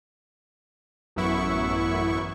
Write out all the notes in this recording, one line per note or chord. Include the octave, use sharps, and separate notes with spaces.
A1 F#2 B3 E4 C#6